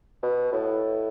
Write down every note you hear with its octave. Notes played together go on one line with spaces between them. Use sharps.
B2
A2